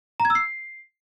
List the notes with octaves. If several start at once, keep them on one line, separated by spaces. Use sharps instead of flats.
A#5
G#6
E6
C7